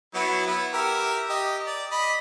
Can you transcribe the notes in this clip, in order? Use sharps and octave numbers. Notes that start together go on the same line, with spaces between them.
F#3 B3 E4
B3 E4
G4 A#4 E5
G4 D#5
D5
D#5 B5